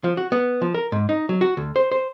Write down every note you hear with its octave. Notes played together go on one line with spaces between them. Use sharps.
F3
F#4
B3
F3
A#4
G#2
D#4
F#3
F#4
D2
C5
C5